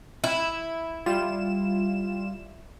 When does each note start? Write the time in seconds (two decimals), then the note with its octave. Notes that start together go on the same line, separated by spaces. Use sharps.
0.24 E4
1.06 G3 F4 E7